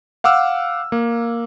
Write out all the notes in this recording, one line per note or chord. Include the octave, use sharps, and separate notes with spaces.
F5 F#5 D6 E6 F6
A#3